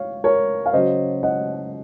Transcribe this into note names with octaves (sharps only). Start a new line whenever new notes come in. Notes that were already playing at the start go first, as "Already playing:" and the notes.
Already playing: C#5 F5
A#4 C#5
F5
C#3 F#3 C5 D#5
D#5 F#5